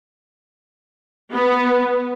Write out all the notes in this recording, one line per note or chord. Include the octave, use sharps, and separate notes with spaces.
B3